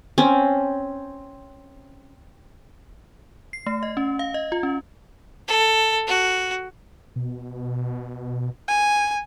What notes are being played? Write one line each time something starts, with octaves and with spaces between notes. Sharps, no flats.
C4 C#4
C7
A3
D#5
C#4
F5
D#5
F4
C#4
A4
F#4
B2
G#5